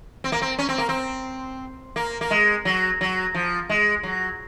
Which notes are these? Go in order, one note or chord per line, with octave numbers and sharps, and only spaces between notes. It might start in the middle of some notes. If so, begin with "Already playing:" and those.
C4
A#3
C4
C#4
C4
A#3
C4
A#3
A#3
G#3
F#3
F#3
F3
G#3
F#3